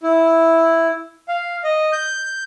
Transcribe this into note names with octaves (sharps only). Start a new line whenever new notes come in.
E4
F5
D#5
G6